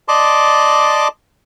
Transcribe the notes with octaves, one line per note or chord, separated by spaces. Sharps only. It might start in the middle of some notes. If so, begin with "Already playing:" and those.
D5 D#5 A5 C6 D6